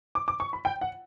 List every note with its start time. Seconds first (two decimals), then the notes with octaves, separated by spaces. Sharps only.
0.15 D6
0.28 D6
0.40 C#6
0.53 B5
0.65 G5
0.81 F#5